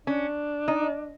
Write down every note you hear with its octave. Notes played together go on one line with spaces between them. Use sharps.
C#4 D4
D#4